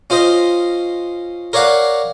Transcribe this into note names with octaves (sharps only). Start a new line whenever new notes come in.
C#4 F4 C5 D#5
A#4 C#5 D5 F5 F#5